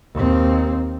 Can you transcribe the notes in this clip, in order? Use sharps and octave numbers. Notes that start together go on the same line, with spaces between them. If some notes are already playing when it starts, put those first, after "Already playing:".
D#2 C4